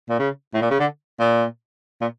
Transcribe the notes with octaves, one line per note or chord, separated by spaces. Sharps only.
A#2
C#3
A2
A#2
C#3
D3
A#2
A#2